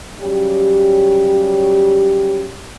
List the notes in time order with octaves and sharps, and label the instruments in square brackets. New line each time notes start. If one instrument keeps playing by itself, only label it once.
[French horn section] C#3 F#3 G3 G4